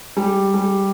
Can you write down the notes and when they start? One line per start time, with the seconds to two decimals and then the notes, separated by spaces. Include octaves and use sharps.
0.16 G3
0.54 G3